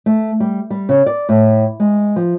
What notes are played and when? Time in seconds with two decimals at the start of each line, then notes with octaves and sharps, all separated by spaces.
0.06 A3
0.40 G3
0.70 G3
0.89 C#3
1.06 D5
1.29 A2
1.80 G#3
2.16 F3